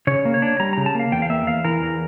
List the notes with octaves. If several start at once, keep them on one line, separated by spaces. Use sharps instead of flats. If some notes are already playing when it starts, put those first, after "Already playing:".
C#3 C#5
A#3
C#5
D4
G3 A#5
C#3 A#5
A5
A#3 F5
E2 G5
F5
A#3 E5
E2 F5
E3 A#4
E2